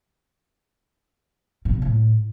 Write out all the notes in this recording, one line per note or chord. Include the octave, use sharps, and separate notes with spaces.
A2
A#2
A2